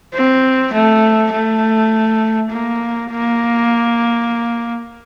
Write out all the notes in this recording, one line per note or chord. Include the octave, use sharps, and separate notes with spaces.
C4
A3
A3
A#3
A#3